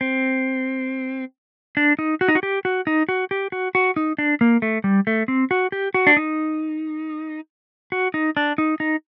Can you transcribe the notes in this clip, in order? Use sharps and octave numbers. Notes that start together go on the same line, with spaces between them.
C4
D4
D#4
F#4
D#4
F#4
G4
F#4
D#4
F#4
G4
F#4
F#4
D#4
D4
A#3
A3
G3
A3
C4
F#4
G4
F#4
D4
D#4
F#4
D#4
D4
D#4
D#4